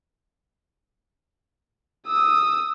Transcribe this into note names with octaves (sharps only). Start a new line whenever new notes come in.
D#6 E6